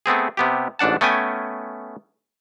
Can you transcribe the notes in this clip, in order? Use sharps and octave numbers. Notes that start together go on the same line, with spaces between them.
A3 B3 C4 G#4
C3 B3 G4
A1 G#2 D4 F#5 A5
A3 B3 C#4 G5 G#5